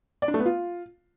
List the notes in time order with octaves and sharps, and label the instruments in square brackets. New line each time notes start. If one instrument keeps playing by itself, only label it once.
[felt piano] D5
D4
A3
B3
F4